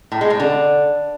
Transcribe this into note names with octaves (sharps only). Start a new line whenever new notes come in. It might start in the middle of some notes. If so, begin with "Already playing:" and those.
A2
G#3
A2
D3